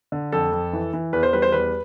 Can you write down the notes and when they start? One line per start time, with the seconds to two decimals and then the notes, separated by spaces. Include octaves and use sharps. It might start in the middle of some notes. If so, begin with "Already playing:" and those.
0.12 D3
0.32 F2 A4
0.52 F2
0.73 E3
0.93 E3
1.13 E2 B4
1.23 C5
1.33 G3 B4
1.42 C5
1.52 E2 B4